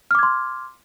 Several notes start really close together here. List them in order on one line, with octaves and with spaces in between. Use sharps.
F6 D6 G#6 C6